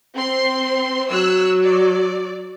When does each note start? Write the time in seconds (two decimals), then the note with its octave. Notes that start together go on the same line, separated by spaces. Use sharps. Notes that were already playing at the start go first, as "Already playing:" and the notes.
0.14 C4 C6
1.10 F#3 E6 F#6
1.64 D5